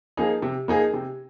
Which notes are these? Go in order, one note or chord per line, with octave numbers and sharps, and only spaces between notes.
F3 A#3 D#4 G#4
C3
F3 A#3 D#4 G#4
C3